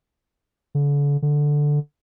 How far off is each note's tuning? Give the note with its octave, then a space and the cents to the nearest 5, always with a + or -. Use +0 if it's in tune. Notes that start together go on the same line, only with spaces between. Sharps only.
D3 -40
D3 +0